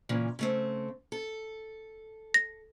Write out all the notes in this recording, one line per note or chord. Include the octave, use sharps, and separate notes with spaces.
A#2 C#3 E3
C#3 A3 C4
A4
A#6